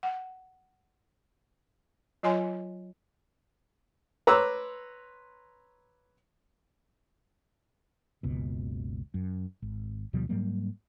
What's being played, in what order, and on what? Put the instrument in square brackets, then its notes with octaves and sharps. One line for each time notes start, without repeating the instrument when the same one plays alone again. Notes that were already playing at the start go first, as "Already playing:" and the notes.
[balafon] F#5
F#3 F4 C#5 D#5 G#5 C6
[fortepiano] B4 C#5 A#5 C6 D6 E6
[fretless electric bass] F#1 C#2 B2
F#2
G#1
D2 B2 F3 G3
G#2 F#3 G3 A#3